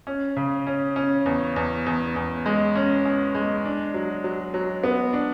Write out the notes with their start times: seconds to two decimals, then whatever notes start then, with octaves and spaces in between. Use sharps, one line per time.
0.07 C#4
0.37 C#3
0.67 C#4
0.96 C#4
1.26 E2
1.56 E2
1.86 E2
2.16 E2
2.46 G#3
2.75 C#4
3.05 C#4
3.35 G#3
3.65 D4
3.94 F#3
4.24 F#3
4.54 F#3
4.84 B3
5.13 D4